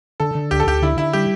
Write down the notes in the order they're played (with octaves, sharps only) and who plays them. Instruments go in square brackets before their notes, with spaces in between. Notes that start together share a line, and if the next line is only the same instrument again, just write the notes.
[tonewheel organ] D3 [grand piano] A4
[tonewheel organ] D3
[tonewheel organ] D2 [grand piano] G4
[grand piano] A4
[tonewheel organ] D2 [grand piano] G4
[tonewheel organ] D3 [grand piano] E4
[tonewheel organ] D3 [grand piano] E4
[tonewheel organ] G3 [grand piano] G4